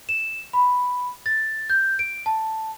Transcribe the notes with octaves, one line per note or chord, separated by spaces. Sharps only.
E7
B5
A6
G6
D7
A5